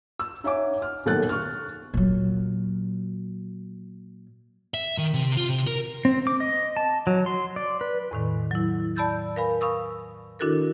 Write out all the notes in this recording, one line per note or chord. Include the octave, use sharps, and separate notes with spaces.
E6
D#4 C#5 E5 F#5 G#5 D6
F6
D#1 B1 A4 A#4 F#6 A6
C#6 F6
A#2 F#3
E5
D#3
C3
F4
C3
A#4
C4
D6
D#5
A5
F#3
C6
D5
B4
E2 A2 D#3
F#3 E4
D5 A5 B5 E6 G6 A6
A#4 B4 F5 G#5 B5
F5 B5 C#6 D#6 E6
D#3 D4 E4 F#4 A4 A#4